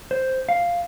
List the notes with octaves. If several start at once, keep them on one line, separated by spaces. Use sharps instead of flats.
C5
F5